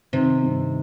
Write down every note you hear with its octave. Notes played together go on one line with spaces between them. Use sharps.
C3 D#3
G2